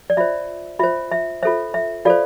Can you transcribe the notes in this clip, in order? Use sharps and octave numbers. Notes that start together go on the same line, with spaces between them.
D5
F4 C5 E5
F4 C5 E5
E5
F4 A4 C5 E5
E5
F4 A4 C5 D5 F5